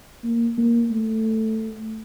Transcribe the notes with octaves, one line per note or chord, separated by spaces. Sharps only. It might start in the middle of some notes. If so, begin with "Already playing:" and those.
A#3
A#3
A3